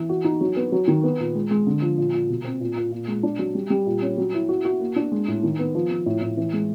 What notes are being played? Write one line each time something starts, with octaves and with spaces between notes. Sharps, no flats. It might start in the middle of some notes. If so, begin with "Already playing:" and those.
Already playing: E3
F#4
D#4
F#3
B3
F#3
D#3
B3
A#2
G#3
G#3
D3
F3
A#2
A#2
B2
C4
A#2
A#2
A#2
G#3
D4
F#3
G3
G3
A#2
C#4
F#3
E4
F#4
F#4
A#3
D4
G#3
A2
D#3
B3
F3
F3
A2
A2
E3
G#3